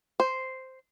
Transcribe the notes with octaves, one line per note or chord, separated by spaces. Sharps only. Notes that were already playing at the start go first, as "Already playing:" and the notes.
C5